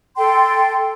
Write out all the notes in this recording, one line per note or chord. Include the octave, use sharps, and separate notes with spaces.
A4 G5 C6